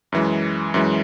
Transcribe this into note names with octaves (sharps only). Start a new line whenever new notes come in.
F#2 E3 G#3
F#2 E3 G#3